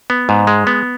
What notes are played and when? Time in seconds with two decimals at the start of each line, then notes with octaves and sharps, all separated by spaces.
0.10 B3
0.29 G#2
0.47 G#3
0.67 B3